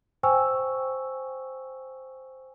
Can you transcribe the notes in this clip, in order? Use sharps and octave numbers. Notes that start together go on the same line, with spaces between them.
C5 G5 G#5 C#6 E6